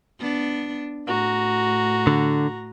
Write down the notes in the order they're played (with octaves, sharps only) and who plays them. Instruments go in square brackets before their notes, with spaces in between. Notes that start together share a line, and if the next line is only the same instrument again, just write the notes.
[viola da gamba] B3 D4
[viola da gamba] A2 [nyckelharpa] F#4 A#5
[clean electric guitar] D3